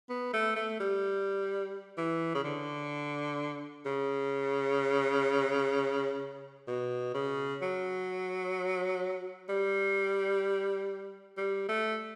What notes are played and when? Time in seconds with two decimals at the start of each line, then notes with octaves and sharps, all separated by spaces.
0.10 B3
0.33 A3
0.56 A3
0.80 G3
1.98 E3
2.35 C#3
2.44 D3
3.86 C#3
6.68 B2
7.14 C#3
7.62 F#3
9.49 G3
11.37 G3
11.69 A3